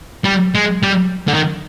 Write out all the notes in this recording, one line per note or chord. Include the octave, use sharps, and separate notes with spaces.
G3
G#3
G3
D3
D#3